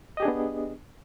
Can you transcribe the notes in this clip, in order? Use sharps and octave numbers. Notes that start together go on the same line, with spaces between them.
B3 D4 G4 G#4 D#5